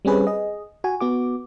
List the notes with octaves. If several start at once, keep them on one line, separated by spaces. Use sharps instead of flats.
G3 C4 C#4 G#4 B4
G#4 D#5
F#4 G#5
B3 F#4 D6